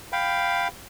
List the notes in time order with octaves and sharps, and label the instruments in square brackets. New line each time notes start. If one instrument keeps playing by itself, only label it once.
[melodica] F5 G5 B5